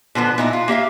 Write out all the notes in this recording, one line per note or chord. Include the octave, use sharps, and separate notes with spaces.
B2 D3 F3 B3
A#2 D#4 E4
F4
A#3 G4 E5 F5